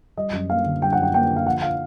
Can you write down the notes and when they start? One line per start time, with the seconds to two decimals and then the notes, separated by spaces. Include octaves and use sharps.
0.17 G3 D#5
0.33 F#2
0.50 A#3 F5
0.66 D3
0.82 G3 G5
0.93 F#5
0.98 F#2
1.03 G5
1.14 A#3 G5
1.30 D3
1.36 F5
1.46 F3 F#5
1.62 F5